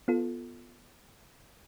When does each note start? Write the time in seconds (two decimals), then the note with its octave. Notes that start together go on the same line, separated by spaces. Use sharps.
0.08 B3 F4 A4